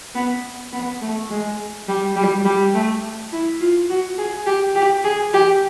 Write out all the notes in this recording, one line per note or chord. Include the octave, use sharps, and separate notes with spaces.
B3
B3
A3
G#3
G3
G3
G3
A3
E4
F4
F#4
G#4
G4
G4
G#4
G4